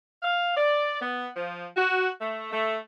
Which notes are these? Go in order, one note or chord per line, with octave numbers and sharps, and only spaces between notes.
F5
D5
B3
F3
F#4
A3
A3